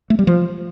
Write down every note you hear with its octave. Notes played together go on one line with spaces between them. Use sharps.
A3
G3
F3